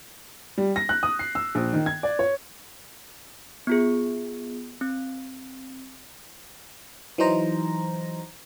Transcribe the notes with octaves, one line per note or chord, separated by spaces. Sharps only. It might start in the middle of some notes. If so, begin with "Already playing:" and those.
G3
A#6
F#6
D#6
C7
E6
A#1
D#3
G#6
D5
C#5
B3 F4 G#4
C4
E3 F#3 D#4 C5 A#5